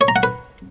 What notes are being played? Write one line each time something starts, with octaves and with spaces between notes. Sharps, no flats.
C#5
A#5
F#5
B4